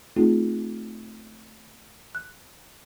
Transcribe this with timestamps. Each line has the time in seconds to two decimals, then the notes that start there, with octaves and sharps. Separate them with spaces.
0.16 A3 C4 D#4 F4 G#4
2.15 F#6